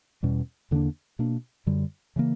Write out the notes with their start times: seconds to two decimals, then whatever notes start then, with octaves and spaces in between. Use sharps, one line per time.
0.23 E2 B2 G3 C#4
0.71 E2 D3 A#3 D4
1.19 B2 A#3 D4
1.67 F#2 D3 G3
2.16 C#3 E3 A#3